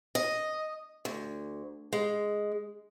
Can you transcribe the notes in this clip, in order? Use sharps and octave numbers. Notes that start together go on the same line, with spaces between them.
D#5
D2
G#3